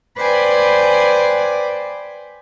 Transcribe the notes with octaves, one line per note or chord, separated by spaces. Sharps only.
B4 C5 D5 G5 G#5